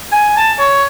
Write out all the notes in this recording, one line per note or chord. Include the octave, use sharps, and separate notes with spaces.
G#5
A5
C#5